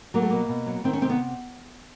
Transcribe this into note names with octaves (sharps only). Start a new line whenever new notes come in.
F#3 A#3
A3
B2 A#3
B2
F#3
D#3 C4
C#4
C3 C4
B3